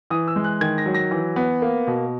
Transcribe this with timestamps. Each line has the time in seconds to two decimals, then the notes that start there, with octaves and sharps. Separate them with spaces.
0.10 E3 D#6
0.28 E6
0.36 G#3
0.44 F#6
0.61 D#3 G#6
0.78 A#6
0.86 F#3
0.94 A#6
1.11 E3
1.36 B3
1.62 A#3
1.87 B2